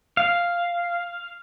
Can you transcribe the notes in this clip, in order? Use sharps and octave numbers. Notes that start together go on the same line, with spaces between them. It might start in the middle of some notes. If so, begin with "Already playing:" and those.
F5